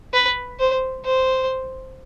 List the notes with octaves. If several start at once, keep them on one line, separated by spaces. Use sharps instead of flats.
B4
C5
C5